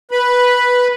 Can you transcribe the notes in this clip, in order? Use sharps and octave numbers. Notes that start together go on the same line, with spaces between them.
B4 B5